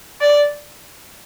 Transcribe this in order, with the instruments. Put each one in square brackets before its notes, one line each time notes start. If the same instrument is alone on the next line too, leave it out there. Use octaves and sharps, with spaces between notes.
[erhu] D5